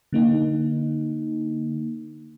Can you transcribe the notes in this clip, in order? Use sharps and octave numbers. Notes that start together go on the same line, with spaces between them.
D3 A#3 D#4